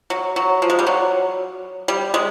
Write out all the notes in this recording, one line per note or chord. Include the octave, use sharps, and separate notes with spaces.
F#3
F#3
F3
G#3
G3
F#3
G3
G#3